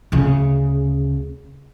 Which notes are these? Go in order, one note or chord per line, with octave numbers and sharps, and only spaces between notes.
D2 C#3